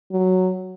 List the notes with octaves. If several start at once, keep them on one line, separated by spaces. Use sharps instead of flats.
F#3